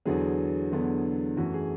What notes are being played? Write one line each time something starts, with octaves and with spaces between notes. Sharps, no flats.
E2 D3 F#3 B3 G#4
E2 D3 F#3 B3
F#2 E3 A3 F#4
G#4